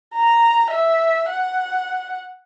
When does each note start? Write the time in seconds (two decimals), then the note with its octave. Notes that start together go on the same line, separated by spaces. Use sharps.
0.15 A#5
0.71 E5
1.30 F#5